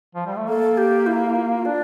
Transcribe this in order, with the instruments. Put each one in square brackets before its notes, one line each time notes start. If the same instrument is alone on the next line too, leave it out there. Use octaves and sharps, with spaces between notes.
[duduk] F3
G3
A3
[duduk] A#3 [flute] A4
[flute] G4
E4
F4
[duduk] D4 [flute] D5